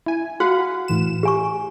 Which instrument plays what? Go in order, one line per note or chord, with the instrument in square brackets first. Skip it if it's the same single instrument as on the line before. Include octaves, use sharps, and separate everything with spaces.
[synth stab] E4 G#5
[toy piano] F#4 [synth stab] F5 F#5 B5
[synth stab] A2 E3 E7
[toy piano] G4 G#5 C#6